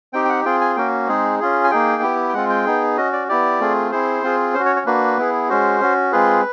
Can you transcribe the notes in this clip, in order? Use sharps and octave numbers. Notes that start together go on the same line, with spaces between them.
C4 D#4 G4 G5
G5
F#5
C4 F4 G#4 G5
G#5
A#3 C#4 F#4 G5
G#3 C4 D#4 G#4
C#4 F4 G#4
G#5
A#3 D#4 G#4 G5
B3 E4 G4
G5
G#3 C4 F4 F#5
G5
B3 D#4 G#4
C#4 F#4 D#5
D5
B3 E4 G4 D5
A3 C4 F4 G#4
C4 E4 G#4 C5
C4 F4 G#4
C#4 C5
F#4
C#5
C#5
A#3 D4 F#4 B4
B3 E4 G#4
G#3 C#4 F#4 C5
C#4 F#4
G#3 C4 F4 G#4 B4